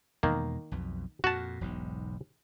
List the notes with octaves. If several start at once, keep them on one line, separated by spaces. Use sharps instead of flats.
E2 B2 D#3 G#3 A#3
B1 F2 B2
F2 A#2 F#4 A5
E1 B1 G#2